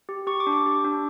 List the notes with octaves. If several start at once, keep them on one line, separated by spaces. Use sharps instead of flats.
G4
G4 C#6
D6
D4
D6
G4
D4